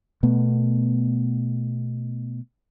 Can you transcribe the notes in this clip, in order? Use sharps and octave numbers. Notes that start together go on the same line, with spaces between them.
B2 A3 B3